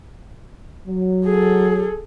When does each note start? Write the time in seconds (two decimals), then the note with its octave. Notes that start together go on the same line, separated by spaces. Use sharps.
0.87 F#3
1.25 G#4 A4